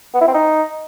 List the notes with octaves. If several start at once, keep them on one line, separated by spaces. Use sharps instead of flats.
B3
E4
C4
D#4